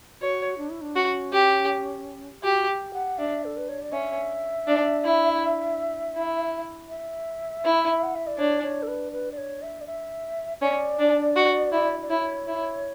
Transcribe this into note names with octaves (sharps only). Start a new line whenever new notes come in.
F#4 C#5
D4
E4
D4
C#4 F#4
G4
F#4 G4
G4
F#5
D4 E5
A4
B4
C#5
D5
C#4 E5
D4
E4
E4
E5
E4
F#5
E5
D5
D4 C#5
C#5
A4
B4
B4
D5
C#5
E5
D5
E5
C#4 D5
D4
F#4
E4
D5
E4 C#5
E4